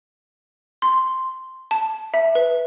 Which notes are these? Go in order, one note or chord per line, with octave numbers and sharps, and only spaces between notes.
C6
A5
E5
B4